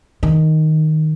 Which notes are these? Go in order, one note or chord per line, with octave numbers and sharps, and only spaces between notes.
D#3